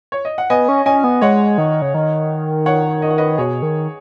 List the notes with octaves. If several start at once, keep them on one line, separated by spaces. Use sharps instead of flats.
C#5
D#5
F#5
B3 D#5 G#5
C#4
C#4 D#5 G#5
B3
G#3 C#5 F#5
D#3
C#3
D#3
C#5 F#5
D#5
F#5
B4 D#5
B2 G#4 C#5
D#3